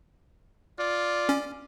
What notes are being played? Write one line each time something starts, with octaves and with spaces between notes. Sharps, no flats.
F4 D5
C#4